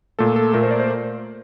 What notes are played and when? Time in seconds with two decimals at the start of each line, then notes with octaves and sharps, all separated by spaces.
0.19 A#2 A3 A4
0.36 A4
0.53 A#2 A3 A#4
0.63 C5
0.71 D5
0.80 C5